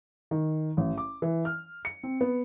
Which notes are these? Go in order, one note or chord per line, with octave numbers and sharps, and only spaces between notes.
D#3
A1
D6
E3
F6
C#7
C4
B3